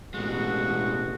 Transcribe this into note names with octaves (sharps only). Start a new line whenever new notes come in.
A1 B2 G#3 F#4